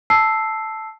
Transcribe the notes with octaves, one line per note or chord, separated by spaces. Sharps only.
A5 E6 C7